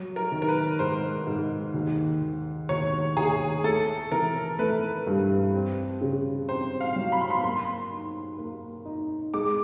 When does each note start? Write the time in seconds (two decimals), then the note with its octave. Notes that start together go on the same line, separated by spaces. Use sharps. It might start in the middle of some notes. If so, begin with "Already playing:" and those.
Already playing: F#3
0.16 A#4
0.32 D#3
0.42 A#4
0.48 B4
0.79 G#2 C5
1.27 G#2
1.74 D#2
2.22 D#2
2.69 D#2 C#5
3.17 D#2 G#4
3.64 A3 A4
4.12 E3 A#4
4.59 A3 B4
5.07 G2
5.54 C4
6.01 C#3
6.48 C4 C5
6.81 F5
6.96 F#3
7.12 B5
7.21 C6
7.30 B5
7.43 A#3 C6
7.91 D#4
8.38 A#3
8.86 D#4
9.34 G#3 D6